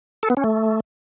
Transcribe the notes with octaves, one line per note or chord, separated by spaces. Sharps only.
A4
B3
C#4
A3